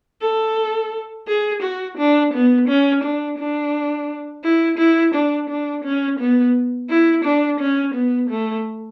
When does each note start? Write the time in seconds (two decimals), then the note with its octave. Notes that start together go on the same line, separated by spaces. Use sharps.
0.22 A4
1.28 G#4
1.62 F#4
1.98 D4
2.34 B3
2.68 C#4
3.04 D4
3.38 D4
4.44 E4
4.78 E4
5.15 D4
5.50 D4
5.84 C#4
6.19 B3
6.90 E4
7.24 D4
7.60 C#4
7.95 B3
8.29 A3